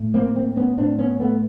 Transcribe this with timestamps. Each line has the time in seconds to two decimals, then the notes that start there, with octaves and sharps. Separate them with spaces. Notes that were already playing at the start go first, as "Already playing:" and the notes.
Already playing: A2
0.14 A#3 C4
0.36 A#3 C4
0.56 B3 C#4
0.77 A2 C4 D4
0.99 B3 C#4
1.20 A3 B3